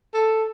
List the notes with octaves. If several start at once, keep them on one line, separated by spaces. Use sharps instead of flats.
A4